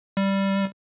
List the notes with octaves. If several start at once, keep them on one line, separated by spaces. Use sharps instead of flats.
G3